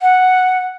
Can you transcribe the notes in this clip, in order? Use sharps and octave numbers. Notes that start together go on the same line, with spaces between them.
F#5